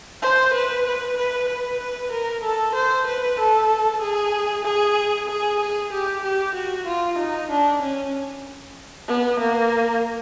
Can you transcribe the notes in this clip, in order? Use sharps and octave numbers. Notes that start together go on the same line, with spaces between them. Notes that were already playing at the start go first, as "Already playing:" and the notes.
C5
B4
B4
B4
B4
B4
A#4
A4
C5
B4
A4
G#4
G#4
G#4
G#4
G4
G4
F#4
F4
D#4
D4
C#4
B3
A#3